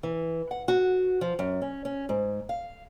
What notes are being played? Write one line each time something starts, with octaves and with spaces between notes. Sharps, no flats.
E3
F#5
F#4
F3
F#2
C#4
C#4
G#2
F5